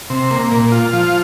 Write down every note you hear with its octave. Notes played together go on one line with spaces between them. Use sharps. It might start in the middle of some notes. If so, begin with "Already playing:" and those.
C3
A#3
A#2
F4
F3